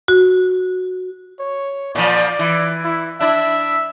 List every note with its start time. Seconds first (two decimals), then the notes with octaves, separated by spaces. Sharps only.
0.08 F#4
1.39 C#5
1.95 A#2 F3 D5
2.39 E3
2.84 E4
3.20 D4 E4 E5